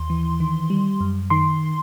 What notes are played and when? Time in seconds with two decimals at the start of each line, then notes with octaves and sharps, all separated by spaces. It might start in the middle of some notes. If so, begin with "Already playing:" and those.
Already playing: D#2 C6
0.10 E3
0.40 D#3
0.70 G3
1.01 F#2
1.30 D#3 C6